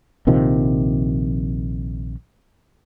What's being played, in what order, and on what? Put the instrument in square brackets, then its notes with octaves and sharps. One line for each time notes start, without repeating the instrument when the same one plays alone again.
[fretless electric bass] A#1 C3 D#3 F3